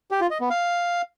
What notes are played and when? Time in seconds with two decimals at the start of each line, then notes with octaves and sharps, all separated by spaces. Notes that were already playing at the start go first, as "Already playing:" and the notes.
0.11 G4
0.21 F4
0.31 D#5
0.40 B3
0.50 F5